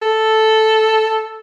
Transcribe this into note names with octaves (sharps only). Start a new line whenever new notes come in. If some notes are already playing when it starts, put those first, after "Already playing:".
A4